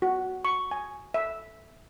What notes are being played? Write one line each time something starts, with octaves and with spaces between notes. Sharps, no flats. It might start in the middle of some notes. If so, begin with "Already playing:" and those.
F#4
C#6
G#5
E5